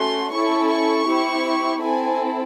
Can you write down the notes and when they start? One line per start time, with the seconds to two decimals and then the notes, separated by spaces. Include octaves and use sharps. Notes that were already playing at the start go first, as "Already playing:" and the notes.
Already playing: A3 C#4 F#4 C6
0.31 C#4 E4 A4 C#6
0.69 C#6
1.07 C4 E4 G4
1.82 C4 E4 A4 G#5